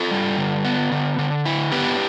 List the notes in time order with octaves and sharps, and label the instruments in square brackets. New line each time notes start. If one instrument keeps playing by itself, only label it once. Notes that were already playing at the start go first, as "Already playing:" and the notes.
Already playing: [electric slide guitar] F4 A4
G3
D3
B3
D3
D3
E4
B3 G4 B4